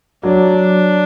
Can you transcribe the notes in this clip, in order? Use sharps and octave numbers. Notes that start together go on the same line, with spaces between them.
F#3 D4